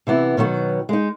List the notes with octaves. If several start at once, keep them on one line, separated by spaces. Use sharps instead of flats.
C3 E3 B3 E4
B2 D#3 F#3 B3
G#3 D#4